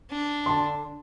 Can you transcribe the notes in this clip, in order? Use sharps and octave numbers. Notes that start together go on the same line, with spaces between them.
D4
D3 A5 C6